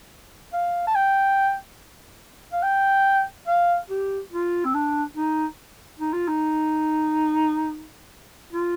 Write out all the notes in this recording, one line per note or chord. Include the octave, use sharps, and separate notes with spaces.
F5
A5
G5
F5
G5
F5
G4
F4
C4
D4
D#4
D#4
F4
D#4
F4